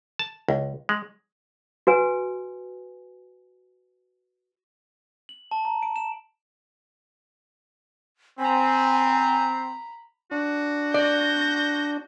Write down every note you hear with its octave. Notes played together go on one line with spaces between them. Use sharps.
A5
C#2
G#3
F#4 B4 G#5
F#7
A5
A#5
D7
E7
C4 G#5 A#5 B5
D4 F#4
D5 G6 A#6